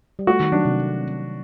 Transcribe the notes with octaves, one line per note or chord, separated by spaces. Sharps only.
G3
A3 F#4
D#3
F#3 D4
C3